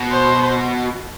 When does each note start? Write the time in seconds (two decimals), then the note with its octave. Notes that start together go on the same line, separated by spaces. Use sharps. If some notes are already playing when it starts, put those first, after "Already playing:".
Already playing: B2
0.12 C5